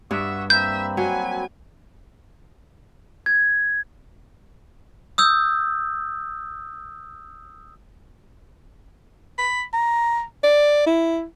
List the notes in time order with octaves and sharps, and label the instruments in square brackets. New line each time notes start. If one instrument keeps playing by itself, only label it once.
[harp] G2 [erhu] E5 [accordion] F#5 C#6 D#6
[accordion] A#3 C4 B5 [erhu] E5 [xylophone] G6
[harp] F#3 [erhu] G#5
[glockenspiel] G#6
D#6 E6 G6
[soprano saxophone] B5
A#5
D5
E4